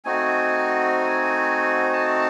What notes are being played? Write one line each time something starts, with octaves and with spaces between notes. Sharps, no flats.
A3 C4 D#4 F#4 G#5
A5